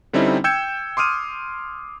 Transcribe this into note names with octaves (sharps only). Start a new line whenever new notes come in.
D3 G3 C4 C#4 D#4 E4
G5 E6 G6 G#6 C#7 E7
C6 D6 D#6 F6 D#7